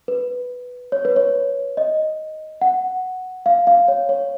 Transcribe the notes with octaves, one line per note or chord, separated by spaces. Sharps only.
B4
C#5
B4
C#5
D#5
F#5
F5
F5
C#5
C#5